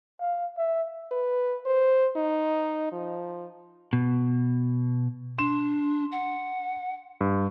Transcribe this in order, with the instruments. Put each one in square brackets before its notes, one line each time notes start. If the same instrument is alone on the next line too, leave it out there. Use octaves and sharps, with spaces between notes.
[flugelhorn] F5
E5
[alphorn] B4
C5
D#4
F3
[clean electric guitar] B2
[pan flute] D4 [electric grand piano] C6 E7
[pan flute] F#5
[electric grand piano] G2